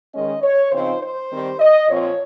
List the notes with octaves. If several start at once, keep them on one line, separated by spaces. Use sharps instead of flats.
D#3 G#3 C#4 D#5
C#5
C#3 F3 C4 D#4 C5
C5
D#3 G3 C4
D#5
A#2 F3 C4 C#5